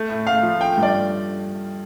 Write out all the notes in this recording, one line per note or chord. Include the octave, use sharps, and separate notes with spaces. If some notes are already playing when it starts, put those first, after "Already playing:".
Already playing: A3
A2
A2 F5
F3
A3 G5
G2
D5